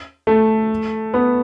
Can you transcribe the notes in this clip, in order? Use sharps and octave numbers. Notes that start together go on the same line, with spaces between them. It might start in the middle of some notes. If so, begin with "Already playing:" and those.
A3
B3